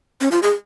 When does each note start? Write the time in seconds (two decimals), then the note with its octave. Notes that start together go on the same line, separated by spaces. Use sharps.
0.21 C#4
0.32 F4
0.43 G#4